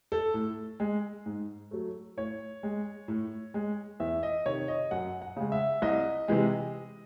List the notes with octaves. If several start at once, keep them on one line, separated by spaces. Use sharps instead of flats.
A4
A2
G#3
G#2
F#3 A3
A2 C#5
G#3
A2
G#3
E2 E5
D#5
C3 D#3 C#5
D#5
F#2 F#5
F#5
C#3 G#3
E5
C2 D#5
C3 E3 G#3